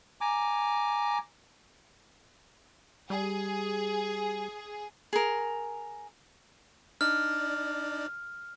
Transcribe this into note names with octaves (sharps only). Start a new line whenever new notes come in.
G#5 A#5 D6
G3 G#4
G#4 A#4
D4 D#4 D5 F6